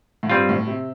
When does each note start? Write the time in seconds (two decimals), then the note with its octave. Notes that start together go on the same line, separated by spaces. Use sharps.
0.23 A2
0.30 G2 G3 C4 F4
0.49 A2
0.67 C3